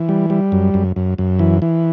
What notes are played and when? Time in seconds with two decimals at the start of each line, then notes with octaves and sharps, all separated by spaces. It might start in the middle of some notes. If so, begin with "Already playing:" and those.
Already playing: E3
0.09 G3
0.30 G3
0.52 F#2
0.74 F#2
0.96 F#2
1.18 F#2
1.39 E3
1.62 E3